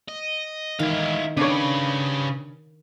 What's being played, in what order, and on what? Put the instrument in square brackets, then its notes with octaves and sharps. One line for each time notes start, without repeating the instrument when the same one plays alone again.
[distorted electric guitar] D#5
[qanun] D#3 [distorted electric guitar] E3 G#3 [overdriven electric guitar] E4 F5
[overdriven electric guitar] C#3 [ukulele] D4 C#5 [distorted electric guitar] G4 B4